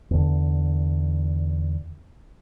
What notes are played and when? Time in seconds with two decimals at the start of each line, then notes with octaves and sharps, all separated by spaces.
0.11 E2 D3